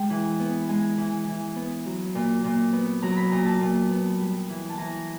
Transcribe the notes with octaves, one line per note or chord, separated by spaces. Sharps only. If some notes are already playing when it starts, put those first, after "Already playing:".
Already playing: G#3 G5
E3
B3
G#3 G#5
E3
E3
B3
F#3
A#2
A#2
B3
F#3 A#5
B5
A#2 A#5
A5
A#2
B3
G3
E3
A5
E3 A#5